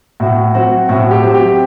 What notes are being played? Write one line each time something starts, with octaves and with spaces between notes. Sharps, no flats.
A2 F#4
F#3 C4 F#4
A2 F#4
G4
F#3 C4
G4